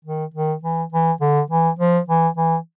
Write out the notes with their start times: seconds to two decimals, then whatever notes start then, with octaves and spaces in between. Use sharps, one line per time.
0.05 D#3
0.34 D#3
0.63 E3
0.92 E3
1.21 D3
1.50 E3
1.79 F3
2.08 E3
2.37 E3